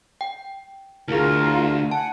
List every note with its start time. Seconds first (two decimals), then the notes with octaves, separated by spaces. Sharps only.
0.21 G5
1.08 D2 E4 F4 G#4 A#4
1.91 F#5 G#5 A5